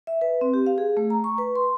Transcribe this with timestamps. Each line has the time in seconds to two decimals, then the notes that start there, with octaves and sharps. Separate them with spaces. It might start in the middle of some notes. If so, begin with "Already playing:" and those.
0.07 E5
0.21 B4
0.41 C4
0.54 G4
0.66 F5
0.78 G#4
0.97 A3
1.10 A#5
1.24 C#6
1.38 B4
1.56 C6